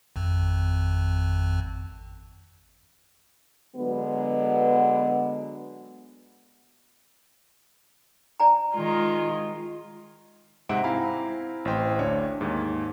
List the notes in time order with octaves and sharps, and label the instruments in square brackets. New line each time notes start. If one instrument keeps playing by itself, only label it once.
[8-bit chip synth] G#1 F2
[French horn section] D3 F#3 G#3 B3
[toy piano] D5 G#5 A#5
[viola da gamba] D#3 G#3 F4
[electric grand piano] G#2 C3 C4 E5 F#5 D7
C4 E4 F5 G#5 A#5 B5
A1 C5 G5 C6
D2 D4 C#5
D#2 G#2